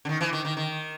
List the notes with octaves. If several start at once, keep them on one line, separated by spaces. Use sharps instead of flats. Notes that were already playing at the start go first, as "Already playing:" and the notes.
D3
D#3
E3
D#3
D#3
D#3